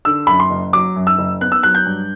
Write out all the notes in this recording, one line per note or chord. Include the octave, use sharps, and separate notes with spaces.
D3 E6
F#2 B5
C6
F#1
F#3 D6
F#2
E6
F#1
B3 F#6
E6
F#3 F#6
G6
G2